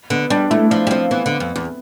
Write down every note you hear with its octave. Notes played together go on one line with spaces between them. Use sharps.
D3 B3
G3 D4
A3 E4
F3 D4
G3
F3 C4
E3 B3
D3
F2
E2